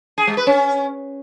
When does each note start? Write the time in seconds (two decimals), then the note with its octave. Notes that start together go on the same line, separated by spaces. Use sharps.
0.18 G#4
0.27 G#3
0.37 B4
0.47 C#4